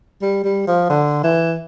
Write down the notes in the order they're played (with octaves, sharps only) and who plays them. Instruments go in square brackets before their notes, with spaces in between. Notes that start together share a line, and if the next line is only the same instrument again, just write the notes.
[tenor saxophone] G3
G3
F3
D3
E3